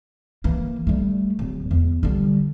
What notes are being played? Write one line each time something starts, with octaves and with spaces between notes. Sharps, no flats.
E3 A#3
G3 A3
D1
E2
D3 G3